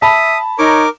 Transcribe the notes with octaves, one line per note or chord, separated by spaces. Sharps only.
E5 A5 B5 D#6
D#4 A#4 C#5 D6